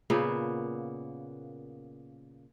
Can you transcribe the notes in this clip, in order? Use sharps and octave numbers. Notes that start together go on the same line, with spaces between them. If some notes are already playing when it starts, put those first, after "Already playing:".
A#2 C#3 A#3 B3